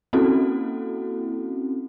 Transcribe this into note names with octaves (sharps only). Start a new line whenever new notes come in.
A#3 C4 C#4 E4 F#4 A4